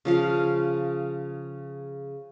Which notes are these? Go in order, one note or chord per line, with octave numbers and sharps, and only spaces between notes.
C#3 F3 F5